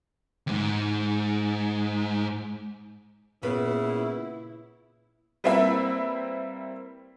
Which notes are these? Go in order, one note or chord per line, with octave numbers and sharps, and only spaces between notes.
D#2 G#2
A#2 C#3 B3 E4 B4
G3 A#3 C4 E4 B4 E5